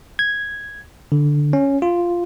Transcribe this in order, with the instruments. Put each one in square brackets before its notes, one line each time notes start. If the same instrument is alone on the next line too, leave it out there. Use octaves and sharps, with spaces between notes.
[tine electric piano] G#6
D3
C#4
F4